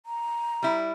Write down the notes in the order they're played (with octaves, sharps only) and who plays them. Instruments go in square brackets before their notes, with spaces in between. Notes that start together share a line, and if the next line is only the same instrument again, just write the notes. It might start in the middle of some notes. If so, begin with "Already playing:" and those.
[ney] A#5
[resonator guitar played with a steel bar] G3 E4